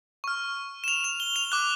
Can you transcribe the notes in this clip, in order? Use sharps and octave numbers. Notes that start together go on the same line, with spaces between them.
C#6 F6
E7
F7
F7
G7
F7
D6 F#6